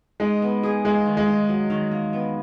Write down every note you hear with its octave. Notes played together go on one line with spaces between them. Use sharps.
G#3 D#4
B3
G#4
G#3 A#3
D#3
G#3
D#4
F#3
D#3
A#3
B3